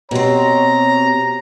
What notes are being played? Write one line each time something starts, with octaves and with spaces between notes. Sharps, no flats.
B2 B3 C4 F#4 G4 C#5 A#5